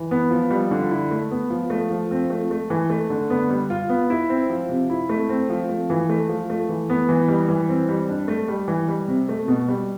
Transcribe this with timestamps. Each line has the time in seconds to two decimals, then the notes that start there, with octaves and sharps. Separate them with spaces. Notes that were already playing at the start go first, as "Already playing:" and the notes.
Already playing: E3
0.11 B3
0.31 F3
0.50 G3
0.71 D3
0.91 E4
1.11 A3
1.31 B3
1.50 F3
1.70 A3
1.91 F3
2.11 C4
2.30 A3
2.51 A3
2.70 E3
2.90 A3
3.10 D3
3.30 B3
3.50 G3
3.70 F4
3.89 B3
4.10 E4
4.29 C4
4.50 F3
4.69 C3
4.90 E4
5.09 A3
5.29 C4
5.50 F3
5.69 A3
5.90 E3
6.09 A3
6.29 F3
6.50 A3
6.69 E3
6.90 B3
7.09 E3
7.28 G3
7.49 E3
7.68 C4
7.89 G3
8.09 D4
8.28 A3
8.48 G3
8.68 E3
8.88 G3
9.08 C3
9.29 A3
9.48 B2
9.68 G3